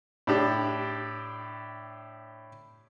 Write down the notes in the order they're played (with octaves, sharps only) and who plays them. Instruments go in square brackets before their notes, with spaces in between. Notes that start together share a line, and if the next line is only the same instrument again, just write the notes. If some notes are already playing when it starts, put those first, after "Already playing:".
[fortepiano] A2 D4 G4